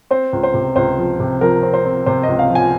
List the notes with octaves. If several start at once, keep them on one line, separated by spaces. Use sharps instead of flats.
C4 C5
C#2
C5
C3
C#2 C5
F3
C3
F3 A#4
C4
C5
C4
C3 C5
D#5
C#2
F5
F3
G#5